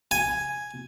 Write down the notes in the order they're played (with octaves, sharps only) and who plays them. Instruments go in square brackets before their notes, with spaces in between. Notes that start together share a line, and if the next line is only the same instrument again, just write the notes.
[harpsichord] G#5